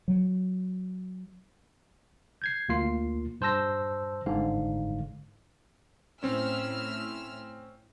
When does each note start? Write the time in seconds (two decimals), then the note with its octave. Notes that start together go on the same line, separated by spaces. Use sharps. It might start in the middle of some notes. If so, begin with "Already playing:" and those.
0.08 F#3
2.42 G6 G#6 C7
2.69 D2 A#3 F4 C7
3.41 G2 C5 A5 E6 A#6
4.26 G1 G#2 D3 F5
6.23 A2 C4 C#4 E6 F6